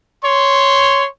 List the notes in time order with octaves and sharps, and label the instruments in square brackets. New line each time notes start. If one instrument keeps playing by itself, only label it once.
[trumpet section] C#5 C6